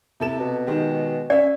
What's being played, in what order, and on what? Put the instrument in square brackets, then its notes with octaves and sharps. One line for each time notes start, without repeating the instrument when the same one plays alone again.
[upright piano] C3 A4 E7 [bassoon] E4
[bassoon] B2
[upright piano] D#3 G#3 G4
[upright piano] C#4 E5 [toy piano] D5